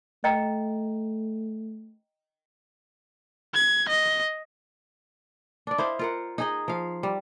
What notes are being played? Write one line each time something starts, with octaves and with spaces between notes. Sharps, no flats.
A3 D#5 G5 A#5
G#6
D#5
D4 D5
E4 C5 D#5 F5
F4 A#4 F#5
D#4 G#4 D#5
F3 F5
G3